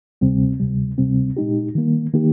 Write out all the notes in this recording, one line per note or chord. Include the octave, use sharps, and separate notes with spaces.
D2 C3 G3 C4
D2 C3 G3
D2 C3 G3 C4
A#2 G#3 D#4 G4
D#3 G3 A#3
D#3 A#3 D#4 G4